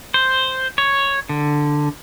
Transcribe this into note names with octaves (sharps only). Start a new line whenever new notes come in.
C5
C#5
D3